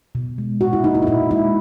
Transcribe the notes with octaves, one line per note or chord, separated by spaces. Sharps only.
B2
G#3
A#2 F#4
E4
A#3 D#4
E4
D#4
A#2 E4
G#3 E4